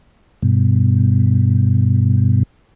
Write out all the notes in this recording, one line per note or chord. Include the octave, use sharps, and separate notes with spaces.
G2 B2